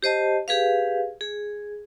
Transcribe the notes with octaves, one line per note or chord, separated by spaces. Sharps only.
G4 C5 D#5 A5
G4 G#4 B4 F5
G#4